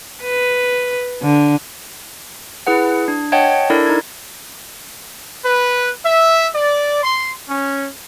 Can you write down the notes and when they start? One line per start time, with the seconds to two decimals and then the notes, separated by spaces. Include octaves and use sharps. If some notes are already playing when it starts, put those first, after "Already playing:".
0.23 B4
1.22 D3
2.67 E4 G#4 B4 F#5
3.08 D4
3.32 C#5 D#5 F#5 G5 A5 G#6
3.70 D4 E4 A4 A#4 D5
3.86 D#4 G#6
5.43 B4
6.03 E5
6.54 D5
7.01 C6
7.48 C#4